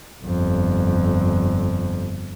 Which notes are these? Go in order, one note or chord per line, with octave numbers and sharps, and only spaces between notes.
G1 F2